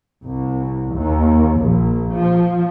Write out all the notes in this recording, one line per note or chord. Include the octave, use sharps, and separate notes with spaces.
C2
D#2
A#1
F3